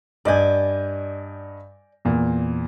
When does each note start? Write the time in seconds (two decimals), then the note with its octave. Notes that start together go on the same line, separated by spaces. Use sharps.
0.25 G2 D5 D#5 G#5 G6
2.05 E2 A#2